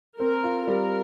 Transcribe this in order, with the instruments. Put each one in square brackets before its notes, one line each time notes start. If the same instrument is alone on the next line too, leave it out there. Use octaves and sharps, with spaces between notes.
[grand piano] C4 [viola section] A#4
[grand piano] F4
[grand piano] G3 [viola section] A#4